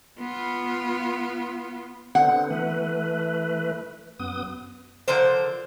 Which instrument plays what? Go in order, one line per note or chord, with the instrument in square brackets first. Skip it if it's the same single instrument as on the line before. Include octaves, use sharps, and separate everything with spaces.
[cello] B3 F4
[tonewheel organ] D3 B3 C4 [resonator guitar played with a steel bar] F#5
[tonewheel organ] E3 A3 B4
F#2 B3 D#6
[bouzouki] D3 F3 A#4 C5